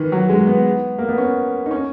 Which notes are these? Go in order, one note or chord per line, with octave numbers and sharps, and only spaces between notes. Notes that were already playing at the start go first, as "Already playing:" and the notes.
Already playing: D#3 E3
F#3
G#3
B3
A#3
B3
C#4
D#4
C#4